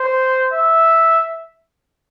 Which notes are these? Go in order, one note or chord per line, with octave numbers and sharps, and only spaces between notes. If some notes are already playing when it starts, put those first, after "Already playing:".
Already playing: C5
E5